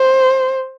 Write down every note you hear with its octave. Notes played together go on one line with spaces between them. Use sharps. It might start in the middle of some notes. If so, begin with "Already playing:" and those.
Already playing: C5